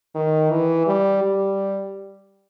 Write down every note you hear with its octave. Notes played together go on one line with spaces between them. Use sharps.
D#3
E3
G3
G3